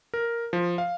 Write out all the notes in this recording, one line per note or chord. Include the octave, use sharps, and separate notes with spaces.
A#4
F3
F5